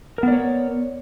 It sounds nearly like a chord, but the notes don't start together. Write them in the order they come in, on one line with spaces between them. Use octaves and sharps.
A#4 B3 D5 C#5